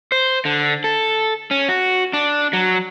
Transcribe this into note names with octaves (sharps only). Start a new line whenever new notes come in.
C5
D3
A4
C#4
F#4
D4
F#3